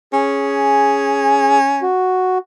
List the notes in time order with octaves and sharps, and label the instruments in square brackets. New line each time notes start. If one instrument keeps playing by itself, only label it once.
[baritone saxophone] C#4 [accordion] G#4
[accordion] F#4